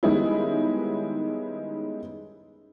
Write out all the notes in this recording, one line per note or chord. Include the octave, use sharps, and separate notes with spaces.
D#3 G3 G#3 B3 C#4 E4